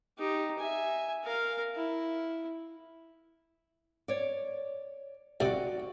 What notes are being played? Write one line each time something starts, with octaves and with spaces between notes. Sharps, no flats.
D#4 G4
E5 G#5
A#4 F5
E4
C#5 D5
C2 C3 F#4 D5